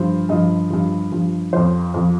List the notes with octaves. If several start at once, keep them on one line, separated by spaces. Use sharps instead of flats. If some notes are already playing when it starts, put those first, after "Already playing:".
Already playing: G2 F3 C5
G2 F3 D#5
G2 F3
G2 F3
F2 F3 C5
F2 F3